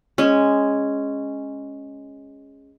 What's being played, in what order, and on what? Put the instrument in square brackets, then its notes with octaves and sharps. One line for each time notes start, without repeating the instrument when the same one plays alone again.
[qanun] G#3 C#4